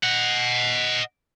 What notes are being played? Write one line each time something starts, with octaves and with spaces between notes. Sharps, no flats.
D#5 F#5